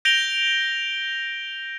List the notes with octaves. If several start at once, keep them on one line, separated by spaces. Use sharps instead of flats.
G6 A#6 D7 F7 G7